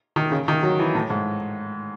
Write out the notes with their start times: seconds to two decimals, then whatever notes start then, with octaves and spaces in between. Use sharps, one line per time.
0.16 D#3
0.32 C#3
0.48 D#3
0.63 F#3
0.79 E3
0.95 A2
1.10 G#2